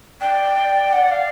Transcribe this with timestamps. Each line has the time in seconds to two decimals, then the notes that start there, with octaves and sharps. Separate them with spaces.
0.21 D5 G5
0.93 F#5
1.11 F5